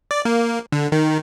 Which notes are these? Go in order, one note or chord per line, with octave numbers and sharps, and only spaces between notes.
D5
A#3
D3
D#3